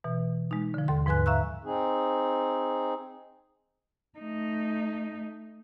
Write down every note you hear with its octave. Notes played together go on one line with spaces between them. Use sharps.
B2 E3
G#3 D#4
D3 F3
D#2 A4 C6
G#2 F3 B4 G#5 F#6
E5 F5 A#5 C#6 E6 F#6
C4 D#4 G#4
A3 D#4